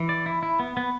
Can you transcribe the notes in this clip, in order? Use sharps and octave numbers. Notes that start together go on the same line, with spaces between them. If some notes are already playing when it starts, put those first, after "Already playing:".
Already playing: E3
D5
E4
E4
B3
B3